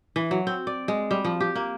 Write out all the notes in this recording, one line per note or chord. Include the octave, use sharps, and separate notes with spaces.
E3
F#3
C4
D5
G#3
G3
F3
G4
A#3